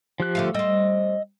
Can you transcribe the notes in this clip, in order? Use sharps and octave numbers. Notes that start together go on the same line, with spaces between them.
F3 G4 F#6
D3 A3 F5
G3 C4 D#5 E6